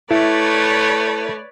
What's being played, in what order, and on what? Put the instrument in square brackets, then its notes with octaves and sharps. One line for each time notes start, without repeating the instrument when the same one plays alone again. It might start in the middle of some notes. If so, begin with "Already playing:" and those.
[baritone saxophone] A3 [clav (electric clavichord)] E4 [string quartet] B4 C#5 D5